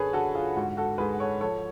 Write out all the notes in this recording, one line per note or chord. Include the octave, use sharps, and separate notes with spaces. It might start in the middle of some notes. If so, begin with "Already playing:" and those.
Already playing: F#2 D3 G#4 A4 B4 C#5
D3 F#4 A4
F4 G#4
G#2 F#4
F#4 A4
G#2 G#4 B4
A4 C#5
F3 A4 C#5